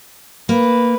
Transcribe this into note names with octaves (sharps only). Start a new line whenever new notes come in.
A#3 B4